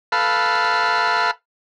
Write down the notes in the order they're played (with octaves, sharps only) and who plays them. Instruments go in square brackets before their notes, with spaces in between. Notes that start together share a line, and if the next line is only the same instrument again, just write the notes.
[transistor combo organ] A4 B4 F5